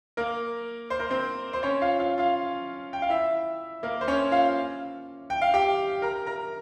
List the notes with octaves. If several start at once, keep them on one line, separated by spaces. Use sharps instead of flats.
A#3 A#4
C5
A#4
C4 C5
C5
C#4 C#5
F4 F5
F4 F5
F4 F5
G5
F5
E4 E5
A#3 A#4
C5
C#4 C#5
F4 F5
G5
F5
G4 G5
A#4 A#5
A#4 A#5